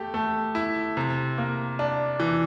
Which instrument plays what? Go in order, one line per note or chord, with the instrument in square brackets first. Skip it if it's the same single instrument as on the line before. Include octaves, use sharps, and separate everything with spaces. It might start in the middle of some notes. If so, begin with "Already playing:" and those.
Already playing: [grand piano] A3 G4
A3
E4
C3
A#3
D4
E3